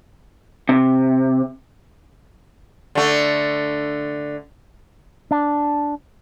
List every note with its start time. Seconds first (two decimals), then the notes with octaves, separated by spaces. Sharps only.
0.69 C3
2.95 D3 A3
5.31 D4